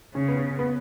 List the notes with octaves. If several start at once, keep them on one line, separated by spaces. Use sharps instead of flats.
C#3 C#4
B3
C#4
B3